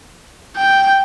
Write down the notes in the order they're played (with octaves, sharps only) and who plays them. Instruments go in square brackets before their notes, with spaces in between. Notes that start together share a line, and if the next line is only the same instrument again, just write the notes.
[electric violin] G5